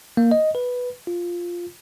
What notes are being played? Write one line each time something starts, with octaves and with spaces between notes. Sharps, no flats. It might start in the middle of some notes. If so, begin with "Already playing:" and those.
A#3
D#5
B4
F4